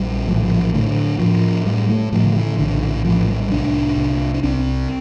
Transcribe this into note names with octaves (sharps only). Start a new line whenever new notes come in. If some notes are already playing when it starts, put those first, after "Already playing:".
Already playing: A#1 G3
A2 F3
E3
F3
A2 D3
A2 F3
A2 G3
A3
A2 F3
D3
E3
A#1 D3
E3
A2 F3
G3
C2 D4
C2
D4
C2 C4